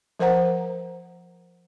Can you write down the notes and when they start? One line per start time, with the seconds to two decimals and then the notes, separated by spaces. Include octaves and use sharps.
0.19 F3 A#4 C5 F#5 A#5